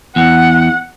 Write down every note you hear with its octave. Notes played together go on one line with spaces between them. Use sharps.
E2 F#5